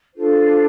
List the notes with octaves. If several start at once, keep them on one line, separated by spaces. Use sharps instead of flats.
D4 F4 A4 C5